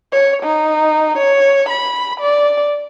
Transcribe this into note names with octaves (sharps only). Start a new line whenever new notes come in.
C#5
D#4
C#5
B5
D5